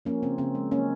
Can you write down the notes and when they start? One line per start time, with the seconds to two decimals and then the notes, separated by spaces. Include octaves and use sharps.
0.05 F3 A#3 C#4
0.23 C#3 C4
0.38 C#3 C4
0.55 G#3
0.71 F#3 A#3 C#4